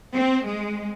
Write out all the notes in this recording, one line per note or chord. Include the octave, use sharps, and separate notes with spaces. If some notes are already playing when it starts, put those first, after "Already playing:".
C4
G#3